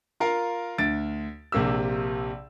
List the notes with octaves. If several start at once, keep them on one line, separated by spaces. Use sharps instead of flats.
F4 A#4 F5
D2 A6 D7
A#1 C3 A#3 G4 E6